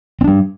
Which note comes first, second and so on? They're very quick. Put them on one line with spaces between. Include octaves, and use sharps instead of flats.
C4 D4 G3